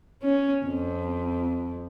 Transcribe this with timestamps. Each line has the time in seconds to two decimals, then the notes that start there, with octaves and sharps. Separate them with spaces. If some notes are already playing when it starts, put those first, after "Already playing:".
0.23 C#4
0.66 F2